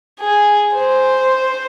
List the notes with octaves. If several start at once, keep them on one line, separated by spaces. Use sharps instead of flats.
G#4
C5